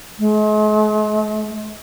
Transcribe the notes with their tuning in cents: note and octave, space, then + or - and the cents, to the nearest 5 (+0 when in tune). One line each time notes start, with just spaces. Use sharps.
G#3 +45